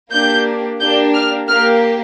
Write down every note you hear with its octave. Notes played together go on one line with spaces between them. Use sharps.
A#3 D4 G4 G6
A#3 D4 G4 G6
F6
A#3 G4 F6